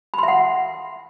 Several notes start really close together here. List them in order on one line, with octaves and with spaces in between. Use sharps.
B5 C6 E5 F#5